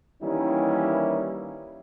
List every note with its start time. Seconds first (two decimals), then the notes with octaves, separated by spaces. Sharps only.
0.23 D#3 E3 G3 A#3 C#4 E4